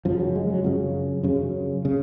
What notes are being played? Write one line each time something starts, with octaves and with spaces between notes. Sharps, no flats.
F#2 C#3 F3
F#3
G#3
F#3
F#2 C#3 F3
F#2 C#3
C#3